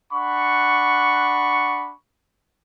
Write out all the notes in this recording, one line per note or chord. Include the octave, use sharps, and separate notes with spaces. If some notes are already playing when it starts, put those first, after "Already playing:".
D4 F#5 B5 C#6